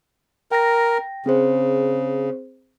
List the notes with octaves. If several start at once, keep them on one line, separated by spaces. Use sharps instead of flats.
A#4 G5 A#6
C#3 C4 G#4 C5